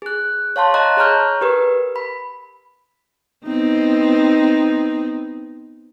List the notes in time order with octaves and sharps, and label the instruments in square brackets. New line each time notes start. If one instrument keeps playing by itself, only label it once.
[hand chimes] G#4 F#6
C#5 F5 A5 C6
D#5 A5 A#5 F#6
G#4 C#5 A#5 F6 G6
G4 A#4 B4
B5
[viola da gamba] B3 C4 D#4